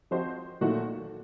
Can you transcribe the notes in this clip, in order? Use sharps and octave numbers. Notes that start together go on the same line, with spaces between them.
F3 C4 F#4 C5 D#5
A#2 F#3 A3 D#4 F#4